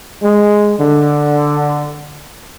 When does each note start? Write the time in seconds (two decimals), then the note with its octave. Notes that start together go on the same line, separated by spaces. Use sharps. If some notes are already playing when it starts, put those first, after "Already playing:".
0.22 G#3
0.79 D3